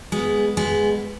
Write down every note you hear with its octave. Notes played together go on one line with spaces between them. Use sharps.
G#3 B3
G#3 B3